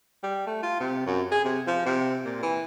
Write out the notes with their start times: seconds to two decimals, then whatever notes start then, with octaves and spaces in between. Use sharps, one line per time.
0.23 G3
0.47 A3
0.63 F4
0.80 C3
1.06 F#2
1.31 G#4
1.44 C3
1.67 F3
1.86 C3
2.25 A#2
2.42 E3